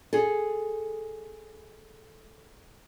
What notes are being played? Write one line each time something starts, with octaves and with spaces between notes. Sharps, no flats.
G#4 A4